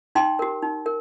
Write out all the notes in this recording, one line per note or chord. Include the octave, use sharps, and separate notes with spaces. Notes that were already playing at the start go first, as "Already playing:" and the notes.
D#4 G5 C6
G4 A#4
D#4
A#4